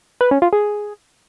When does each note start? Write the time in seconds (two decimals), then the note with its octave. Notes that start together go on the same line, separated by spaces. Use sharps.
0.21 B4
0.31 C#4
0.42 F4
0.53 G#4